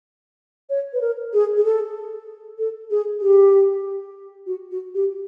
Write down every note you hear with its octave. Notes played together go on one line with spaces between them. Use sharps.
C#5
B4
A#4
G#4
G#4
A4
A4
G#4
G4
F#4
F#4
G4